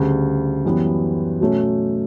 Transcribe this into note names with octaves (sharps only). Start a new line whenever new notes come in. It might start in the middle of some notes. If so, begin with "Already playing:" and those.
Already playing: D2 C#3 G3
F#2 E3 G3 B3
B2 F#3 A3 C#4